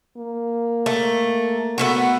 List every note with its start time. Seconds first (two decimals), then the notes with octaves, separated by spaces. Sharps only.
0.17 A#3
0.86 A3
1.78 A3 B3 F#4